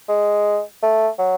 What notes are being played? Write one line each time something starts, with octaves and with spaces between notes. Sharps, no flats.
G#3
A3
F#3